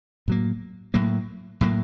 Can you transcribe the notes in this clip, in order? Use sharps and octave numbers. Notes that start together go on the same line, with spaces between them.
A2 F#3 A#3
A2 F#3 A#3
A2 F#3 A#3